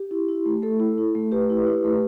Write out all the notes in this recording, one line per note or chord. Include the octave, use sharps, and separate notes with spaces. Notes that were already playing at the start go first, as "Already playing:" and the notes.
Already playing: G4
E4
E4
A3
A3 A4
E4
E4
A3
A3 G4 B4
E4
E4
A3